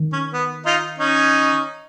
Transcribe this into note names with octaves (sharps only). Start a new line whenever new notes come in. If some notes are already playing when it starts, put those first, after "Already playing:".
Already playing: D#3
C#4
B3
D#4 F4
C#4 D#4